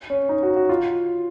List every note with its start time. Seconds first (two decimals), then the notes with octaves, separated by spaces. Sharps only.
0.10 C#4
0.29 D#4
0.43 F#4
0.56 F#4
0.69 F4